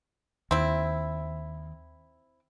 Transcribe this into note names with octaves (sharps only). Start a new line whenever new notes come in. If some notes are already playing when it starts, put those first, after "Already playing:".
D#2 C4 E4